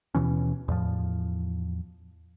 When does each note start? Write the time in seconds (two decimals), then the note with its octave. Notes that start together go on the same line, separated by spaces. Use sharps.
0.15 D#2 B2 E3 C#4
0.68 E2 A2 F3